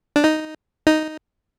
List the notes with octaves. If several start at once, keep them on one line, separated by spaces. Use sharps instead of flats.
D4
D#4
D#4